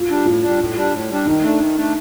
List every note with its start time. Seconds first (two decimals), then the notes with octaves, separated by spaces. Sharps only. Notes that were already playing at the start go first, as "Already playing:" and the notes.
Already playing: F4
0.10 G3 D4
0.26 A2 F4
0.43 G3 D4
0.59 A2
0.76 G3 D4
0.93 A2
1.10 G3 D4
1.26 D#3 D#4
1.43 A3 D4
1.60 D#3
1.77 A3 D4